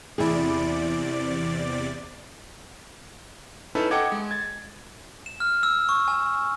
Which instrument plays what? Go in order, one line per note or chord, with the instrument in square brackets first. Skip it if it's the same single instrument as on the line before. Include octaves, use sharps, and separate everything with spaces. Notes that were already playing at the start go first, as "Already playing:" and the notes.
[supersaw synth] E2 C3 D5 [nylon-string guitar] E4 G#4
[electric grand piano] C#4 D#4 E4 A4 B4 E5
A4 D#5 F#5 G5 D6 G#6
G#3
G#6 A6
[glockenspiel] E7
F6
E6
C#6
G#5